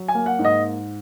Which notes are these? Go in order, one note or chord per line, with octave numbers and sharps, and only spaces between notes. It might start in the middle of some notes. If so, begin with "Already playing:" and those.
Already playing: F#3
G#5
A#3
F#5
G#2
D#5